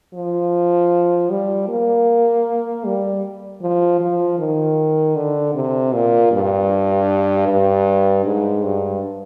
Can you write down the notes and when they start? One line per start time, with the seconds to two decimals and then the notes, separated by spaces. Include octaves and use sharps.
0.14 F3
1.30 G3
1.68 A#3
2.85 G3
3.62 F3
4.00 F3
4.39 D#3
5.16 D3
5.55 C3
5.94 A#2
6.32 G2
7.48 G2
8.25 G#2
8.63 G2